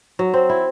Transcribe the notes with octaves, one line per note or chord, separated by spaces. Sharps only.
F#3
C4
E4